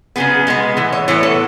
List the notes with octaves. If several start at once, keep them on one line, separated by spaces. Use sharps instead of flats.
C#3 F#3 B3 G#4
B2 G#3 B3
A2 E3
C#5
A2 E3 B3 C#5
A4